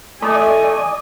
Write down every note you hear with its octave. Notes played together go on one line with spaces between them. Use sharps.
A3 D5 D#5 G#5